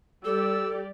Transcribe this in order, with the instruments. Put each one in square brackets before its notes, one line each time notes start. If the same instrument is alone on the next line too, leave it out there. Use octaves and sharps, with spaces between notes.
[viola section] G3 G4 D5 [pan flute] A4 [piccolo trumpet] E6